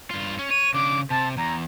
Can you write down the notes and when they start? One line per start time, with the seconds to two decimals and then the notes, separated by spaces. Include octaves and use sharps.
0.11 G2 F4
0.39 C#4
0.50 C#5 D#7
0.74 C#3 D4 D6
1.10 C3 A5
1.37 E2 A#5